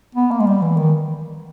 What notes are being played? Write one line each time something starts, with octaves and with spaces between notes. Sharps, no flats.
B3
A#3
G#3
G3
E3
D#3